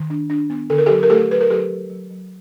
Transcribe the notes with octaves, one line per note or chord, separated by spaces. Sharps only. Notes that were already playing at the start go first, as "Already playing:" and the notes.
Already playing: D#3
D4
D4
B3
D3 A4
A#4
G4 A4
F#3
A#4
A3 G4 A4
F#3 B4
A#4
F#3 G4 A4
F#3
F#3
F#3